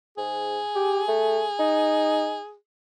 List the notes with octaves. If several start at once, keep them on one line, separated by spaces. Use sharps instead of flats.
G#2 G#4
G4
A3
D#4